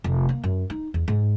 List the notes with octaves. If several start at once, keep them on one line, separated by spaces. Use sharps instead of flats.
F1
A#3
F#2
D#4
E2
G#2